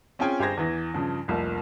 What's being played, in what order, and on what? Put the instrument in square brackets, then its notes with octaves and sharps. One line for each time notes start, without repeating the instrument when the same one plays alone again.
[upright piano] C4 C#4 F4 G#4 G5 G#5
G1 G4 G#4 C5 G#6 A#6
E2 E3
G2 C#3 F3
F1 C2 F3 A#3